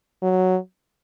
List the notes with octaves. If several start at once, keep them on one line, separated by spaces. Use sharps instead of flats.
F#3